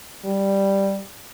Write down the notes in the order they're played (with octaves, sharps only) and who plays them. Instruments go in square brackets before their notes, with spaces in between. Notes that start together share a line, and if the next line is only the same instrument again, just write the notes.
[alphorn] G3